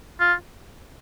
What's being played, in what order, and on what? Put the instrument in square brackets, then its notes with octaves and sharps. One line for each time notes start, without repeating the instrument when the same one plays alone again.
[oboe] F4